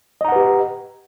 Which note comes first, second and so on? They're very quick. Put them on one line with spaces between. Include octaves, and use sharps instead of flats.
D#5 A#5 F#5 B4 G4